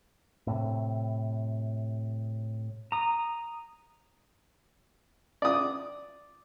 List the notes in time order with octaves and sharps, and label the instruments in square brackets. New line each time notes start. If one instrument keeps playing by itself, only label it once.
[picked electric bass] A2 C3
[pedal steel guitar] A#5 D#6
[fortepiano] D5 D#6